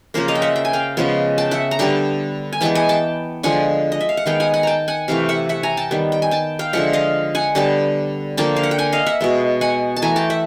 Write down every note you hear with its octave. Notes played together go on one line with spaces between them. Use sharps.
C#3 F3 A#3 A#4 C5
D#5 F5
G5
E5 F#5
G5
G#5
F5 G5
C#3 F3 G#3 B3
G5 A5
E5 F#5
A#5
D3 G3 B3 G5 A5
G#5
E3 G#3 B3 G5 A5
F#5 G#5
G5 A5
D3 F3 G#3 F#5 G#5
D#5
E5
F5
F#5
D#3 G#3 B3 F5 G5
F#5 G#5
F#5 G#5
G5 A5 A#5
F#5 G#5
C3 E3 A3 F5 G5
E5 F#5
E5 F#5
G#5 A#5
G5 A5
D#3 G3 B3
G5
G#5
G5 A5
F5 G5
D3 F3 G#3 E5 F#5
D#5 F5
F#5 G#5
D3 G3 B3 G5 A5
D3 F3 A#3 G5 A5
F5
F#5
G5
F#5 G#5
D#5 F5
E5 F#5
B2 G#3 B3
F#5 G#5
A5
E3 A3 G#5 A#5
G5 A5
E5 F#5